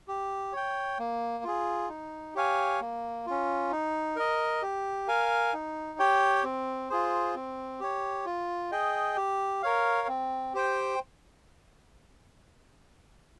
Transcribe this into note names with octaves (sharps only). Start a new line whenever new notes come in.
G4
C#5 G5
A#3
F4 G#4
D#4
G4 C#5 F5 G#5
A#3
C#4 F4
D#4
A#4 D#5
G4
A#4 F5 G#5
D#4
G4 C#5 G5
C4
F4 G#4 C5
C4
G4 C#5
F4
G#4 D#5 G5
G4
A#4 C#5 F5
C4
G4 C5 G5